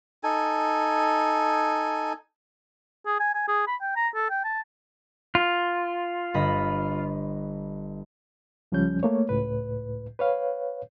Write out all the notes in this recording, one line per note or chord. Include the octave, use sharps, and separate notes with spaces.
D#4 A4 G#5
G#4
G#5
G#5
G#4
B5
G5
A#5
A4
G5
A5
F4
G1 D#5 B5
C#2 F3 G3 C#4 G6
A3 A#3 C#5
C#2 A2 B4
B4 C#5 F5